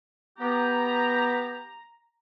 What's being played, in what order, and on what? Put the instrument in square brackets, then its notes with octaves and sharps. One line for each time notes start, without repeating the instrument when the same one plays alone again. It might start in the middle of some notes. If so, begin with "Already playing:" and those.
[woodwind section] B3 G4 [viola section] A#5